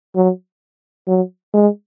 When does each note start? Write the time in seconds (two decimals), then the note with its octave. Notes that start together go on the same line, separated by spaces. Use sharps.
0.16 F#3
1.07 F#3
1.54 G#3